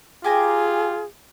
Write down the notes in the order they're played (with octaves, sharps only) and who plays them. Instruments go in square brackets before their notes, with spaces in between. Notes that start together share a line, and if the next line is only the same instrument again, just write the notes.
[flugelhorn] F4 [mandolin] G4 G#5 A#5 [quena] G#4